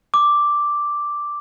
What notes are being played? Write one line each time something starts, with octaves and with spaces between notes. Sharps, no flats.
D6